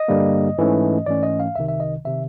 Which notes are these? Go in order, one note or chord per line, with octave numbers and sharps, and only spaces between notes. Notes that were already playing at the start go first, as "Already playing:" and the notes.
Already playing: D#5
G2 D3 G3 A#3
G#2 E3 A3 C#4
G#2 E3 A3 C#4 D5
D#5
F5
C2 C3 D#3 E5
E5
D#5
C3 D#3 E5